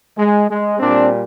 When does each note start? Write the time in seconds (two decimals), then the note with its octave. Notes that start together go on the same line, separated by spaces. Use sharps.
0.18 G#3
0.49 G#3
0.80 A#2 G3 C4 D4